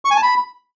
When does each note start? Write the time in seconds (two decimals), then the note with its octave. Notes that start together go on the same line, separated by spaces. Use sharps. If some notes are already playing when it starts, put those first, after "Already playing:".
0.05 C#6
0.11 G#5
0.17 A5
0.23 B5